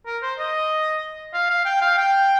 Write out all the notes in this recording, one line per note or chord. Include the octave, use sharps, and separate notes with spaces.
A#4
C5
D#5
F5
F5
G5
F5
G5